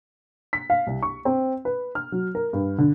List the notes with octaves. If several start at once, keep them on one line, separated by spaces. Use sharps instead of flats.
B6
F5
C2
C#6
C4
B4
F6
F#3
A#4
G2
D3